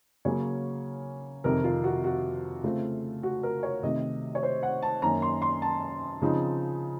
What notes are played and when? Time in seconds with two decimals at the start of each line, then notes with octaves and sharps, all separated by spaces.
0.25 C#3 F#3 A#3 C#4 C#5
1.44 F2 C3 D#3 A#4
1.64 F4
1.84 F#4
2.04 F#4
2.63 C#3 A3 C4 F4
3.23 F#4
3.43 A#4
3.63 C#5
3.83 C3 D#3 A3 D#5
4.35 C#5
4.43 C5
4.63 F#5
4.82 A5
5.02 F#2 D#3 A#3 C#4 A#5
5.22 C6
5.42 C6
5.62 A5
6.22 C#3 F3 C4 D#4